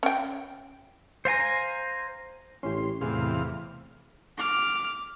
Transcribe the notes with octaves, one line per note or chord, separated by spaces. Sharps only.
C#4 G5
C5 F5 G#5 A#5
A1 C#4 E4 G4 C6
E2 A2 C3 G#4 F5
D6 F6